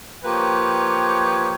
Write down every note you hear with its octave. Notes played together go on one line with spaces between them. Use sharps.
F3 A#3 G4 B4 C#5 G5